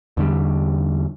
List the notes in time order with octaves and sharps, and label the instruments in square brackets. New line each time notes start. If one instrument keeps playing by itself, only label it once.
[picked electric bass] E2 D3 G3